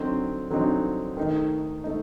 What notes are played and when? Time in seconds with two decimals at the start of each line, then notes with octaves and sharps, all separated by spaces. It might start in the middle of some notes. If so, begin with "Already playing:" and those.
Already playing: D3 F#3 C4 D#4
0.50 D3 F#3 C4 D#4
1.17 D#3 A3 D#4
1.84 A3 D#4